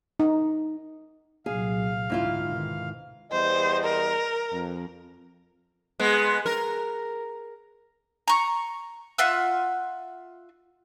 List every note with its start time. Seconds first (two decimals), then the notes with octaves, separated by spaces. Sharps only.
0.20 D#4
1.46 C2 A#2 F#3 G#4 F5
2.10 D2 G#2 C3 E4 F4
2.46 B2 D3 D#3
3.31 E2 G3 C5 D#5
3.84 A#4
4.51 F2
6.00 G#3 B3
6.46 A#4
8.28 A#5 C#6
9.18 F4 E5 F#5 E6